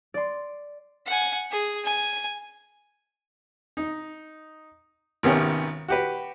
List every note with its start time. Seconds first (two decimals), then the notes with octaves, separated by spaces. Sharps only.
0.14 D5 C6
1.06 F#5 G#5
1.51 G#4
1.84 G#5
3.77 D#4
5.23 G#1 C3 D#3 B3 C#4 G4
5.88 F#4 G4 B4